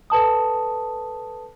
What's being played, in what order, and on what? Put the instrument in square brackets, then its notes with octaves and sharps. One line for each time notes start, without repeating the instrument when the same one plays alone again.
[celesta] A4 B4 A5 D#6